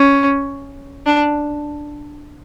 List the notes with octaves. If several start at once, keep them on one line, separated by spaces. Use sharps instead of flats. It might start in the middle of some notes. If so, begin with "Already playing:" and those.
Already playing: C#4
D4